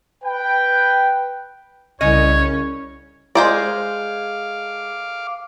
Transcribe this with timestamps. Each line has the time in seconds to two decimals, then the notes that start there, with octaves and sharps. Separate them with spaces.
0.23 B4 G5
2.01 C2 C#3 C#4 C#5 D#5
3.35 G#3 C5 D5 F5 D6